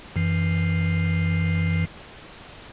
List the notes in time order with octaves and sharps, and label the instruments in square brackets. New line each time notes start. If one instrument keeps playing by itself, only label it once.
[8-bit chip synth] F#2 E3 C7